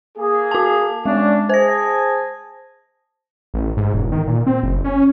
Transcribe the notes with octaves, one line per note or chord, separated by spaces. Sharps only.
A#3 G#4
F#4 A5
G#3 C#4 D4
G#4 C5 G#5 A5 A#6
A1
G#2
E1
D#3
A#2
C4
F#1
C#4